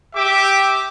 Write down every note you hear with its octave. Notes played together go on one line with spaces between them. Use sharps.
G4 E5 G5 D6